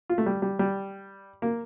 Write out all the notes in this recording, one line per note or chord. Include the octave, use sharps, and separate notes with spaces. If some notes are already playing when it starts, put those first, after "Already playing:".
F4
A3
G3
G3
G3
A#3